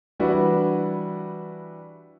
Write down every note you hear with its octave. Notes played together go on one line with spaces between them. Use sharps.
E3 G3 D4 E4 F#4 B4